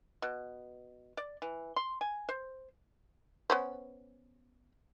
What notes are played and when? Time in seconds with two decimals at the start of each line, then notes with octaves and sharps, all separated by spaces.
0.22 B2
1.17 D5
1.42 E3
1.76 C6
2.01 G#5
2.29 C5
3.50 B3 C#4 C5